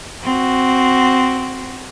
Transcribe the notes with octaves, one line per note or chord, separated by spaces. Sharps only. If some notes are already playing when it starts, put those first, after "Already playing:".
C4 F#4